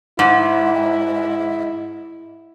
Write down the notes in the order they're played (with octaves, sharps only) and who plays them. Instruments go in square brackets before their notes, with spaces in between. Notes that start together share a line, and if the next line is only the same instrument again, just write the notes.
[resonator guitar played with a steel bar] G#2 [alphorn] E4